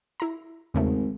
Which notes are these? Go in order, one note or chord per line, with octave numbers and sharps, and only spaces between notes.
E4 A#5
G#1 E2 C#3 A3